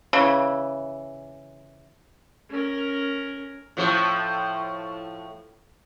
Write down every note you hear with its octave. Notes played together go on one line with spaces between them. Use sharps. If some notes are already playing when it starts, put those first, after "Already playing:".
C#3 E3
C#4 A#4
A2 F3 A4